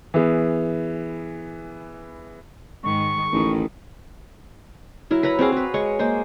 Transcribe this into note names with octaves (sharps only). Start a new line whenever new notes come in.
E3 B3 G#4
G#2 D#3 G#3 C#6
A1 D#3
F#3 E4 A#4
B4 C#5 A#5 B5
C4 F#4 G#4 F5
G#4 B4
G#3 C#5 C#6
G#3 A#3 C5